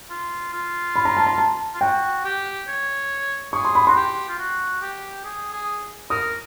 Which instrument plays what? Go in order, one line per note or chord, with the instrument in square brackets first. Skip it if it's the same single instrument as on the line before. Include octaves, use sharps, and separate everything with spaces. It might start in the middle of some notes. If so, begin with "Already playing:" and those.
[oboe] F4
F4
[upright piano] B5
A#5
A5
A#5
A5
[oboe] F4
[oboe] F#4 [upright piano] G5
[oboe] G4
C#5
[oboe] G#4 [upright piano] C#6
[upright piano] C6
B5
[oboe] F#4 [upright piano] C6
[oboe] G4
F4
F#4
G4
G#4
G#4
[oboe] A#4 [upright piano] D#6